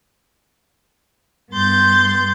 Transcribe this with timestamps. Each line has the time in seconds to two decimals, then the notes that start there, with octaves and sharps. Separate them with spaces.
1.53 G2 B3 C6 G6 A6